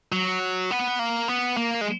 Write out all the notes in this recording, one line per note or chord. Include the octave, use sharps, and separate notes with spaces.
F#3
B3
A#3
B3
A#3
G#3